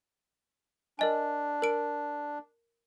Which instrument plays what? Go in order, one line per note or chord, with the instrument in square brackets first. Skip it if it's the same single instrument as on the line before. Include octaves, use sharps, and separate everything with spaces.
[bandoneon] D4 [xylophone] A#4 D#5 G#5
[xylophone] A#4 D7